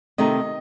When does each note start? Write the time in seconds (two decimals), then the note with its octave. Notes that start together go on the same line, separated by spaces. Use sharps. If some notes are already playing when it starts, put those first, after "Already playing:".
0.18 C3 D#3 A3 D#4 D#5